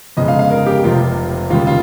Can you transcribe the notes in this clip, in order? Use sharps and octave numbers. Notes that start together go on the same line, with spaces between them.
G1 F2 C#3 G#3 D#5
F5
F5
A#4
G4
F1 F2 C3 F4
D#2 C#3 G3 F4
F4